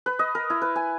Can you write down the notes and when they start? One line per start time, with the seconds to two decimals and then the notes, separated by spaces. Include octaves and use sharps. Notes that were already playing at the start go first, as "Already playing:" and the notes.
0.06 B4
0.19 D#5
0.35 A#4
0.50 E4
0.62 B4
0.76 G#5